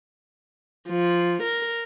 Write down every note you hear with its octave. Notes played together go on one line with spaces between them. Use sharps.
F3
A#4